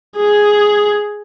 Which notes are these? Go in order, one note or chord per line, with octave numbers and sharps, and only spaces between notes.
G#4